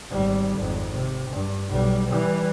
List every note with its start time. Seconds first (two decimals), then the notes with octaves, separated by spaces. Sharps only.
0.11 G#1 G3
0.59 G#1 F2
0.94 C3
1.31 G2
1.69 B1 G3
2.08 E3 G3